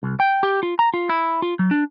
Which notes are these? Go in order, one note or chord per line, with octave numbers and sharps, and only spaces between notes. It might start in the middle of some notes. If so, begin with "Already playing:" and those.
C2
G5
G4
F4
A#5
F4
E4
F4
F#3
D4